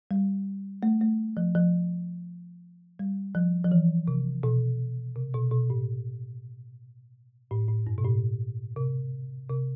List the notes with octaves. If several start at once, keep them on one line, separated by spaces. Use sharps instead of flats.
G3
A3
A3
F3
F3
G3
F3
F3
E3
C3
B2
C3
B2
B2
A2
A2
A2
G2
B2
A2
C3
C3